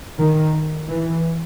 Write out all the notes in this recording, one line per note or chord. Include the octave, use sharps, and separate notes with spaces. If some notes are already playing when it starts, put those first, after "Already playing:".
D#3
E3